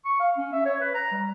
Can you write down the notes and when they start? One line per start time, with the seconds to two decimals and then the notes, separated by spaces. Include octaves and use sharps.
0.05 C#6
0.20 F5
0.37 C#4
0.52 E5
0.66 C#5
0.81 B4
0.94 A#5
1.12 G3